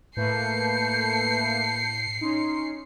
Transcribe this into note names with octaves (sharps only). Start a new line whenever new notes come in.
A2 A3 A#3 B4 A5 G6 C7 C#7
C#4 D#4 C6